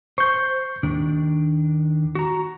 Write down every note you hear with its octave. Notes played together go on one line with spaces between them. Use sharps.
C5 C#6 G6
D#2 D#3 D4
F#4 A#5